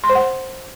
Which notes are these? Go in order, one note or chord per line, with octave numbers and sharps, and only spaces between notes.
C6
C5
F#5